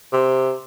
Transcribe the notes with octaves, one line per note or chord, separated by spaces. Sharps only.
C3